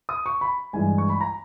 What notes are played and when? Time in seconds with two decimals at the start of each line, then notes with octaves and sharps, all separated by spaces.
0.09 D#6
0.26 C#6
0.41 B5
0.73 G2 E3 G#3 G#5
0.98 C#6
1.09 B5
1.20 A#5